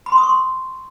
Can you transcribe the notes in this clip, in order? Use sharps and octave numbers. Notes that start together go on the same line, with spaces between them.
B5
C6
D#6
C#6
C6